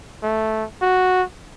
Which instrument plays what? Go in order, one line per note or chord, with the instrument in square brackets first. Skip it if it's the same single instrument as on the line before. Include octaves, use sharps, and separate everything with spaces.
[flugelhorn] A3
F#4